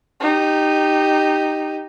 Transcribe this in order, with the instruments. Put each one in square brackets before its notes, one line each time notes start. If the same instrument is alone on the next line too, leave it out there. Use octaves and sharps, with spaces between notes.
[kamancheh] D#4 G4